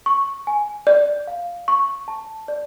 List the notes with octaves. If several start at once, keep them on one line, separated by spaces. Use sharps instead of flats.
C#6
G#5
D5
F5
C#6
A5
D5